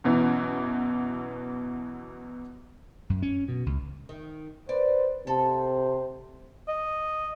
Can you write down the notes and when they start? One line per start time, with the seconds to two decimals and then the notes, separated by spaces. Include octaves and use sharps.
0.04 F#2 B2 E3
3.10 F#2
3.22 C#4
3.48 B2
3.66 C#2
4.09 D#3
4.69 B4 C5 D5
5.27 C3 A4 C5
6.68 D#5